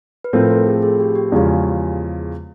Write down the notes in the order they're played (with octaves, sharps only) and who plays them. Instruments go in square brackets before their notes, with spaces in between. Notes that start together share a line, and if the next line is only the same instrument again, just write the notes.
[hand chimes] B4
[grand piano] A2 F3 A3 C4 [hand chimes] A#4
[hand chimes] A4
G#4
G#4
G4
G4
[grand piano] E2 C#3 F3 G#3 C#4